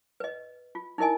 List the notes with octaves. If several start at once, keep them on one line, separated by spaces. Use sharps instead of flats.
B4 D#5
F4
D#4 E4 A#4 D#5 G#5